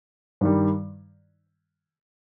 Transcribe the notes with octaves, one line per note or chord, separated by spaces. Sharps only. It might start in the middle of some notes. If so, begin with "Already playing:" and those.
G2 D#3 G3